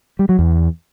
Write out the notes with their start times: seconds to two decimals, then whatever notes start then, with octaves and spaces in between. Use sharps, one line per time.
0.19 G3
0.29 F#3
0.39 E2